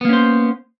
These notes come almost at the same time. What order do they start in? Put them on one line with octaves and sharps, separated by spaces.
B3 A#3 C#4 C5